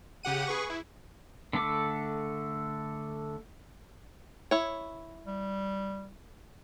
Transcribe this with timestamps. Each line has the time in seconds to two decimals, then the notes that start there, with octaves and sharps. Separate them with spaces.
0.23 C#3 G4 F#5 D#7
0.47 G#4 B4 C#6
0.70 E4
1.53 D3 A3 A4 D6
4.51 E4 C#5
5.27 G3